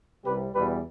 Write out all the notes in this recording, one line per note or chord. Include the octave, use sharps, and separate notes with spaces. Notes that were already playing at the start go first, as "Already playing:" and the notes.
C2 C3 G3 G4 B4
E2 B2 G3 G4 B4